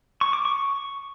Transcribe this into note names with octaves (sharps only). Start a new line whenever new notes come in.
C#6
D6
C#6